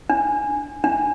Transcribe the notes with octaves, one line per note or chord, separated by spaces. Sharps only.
D4
D4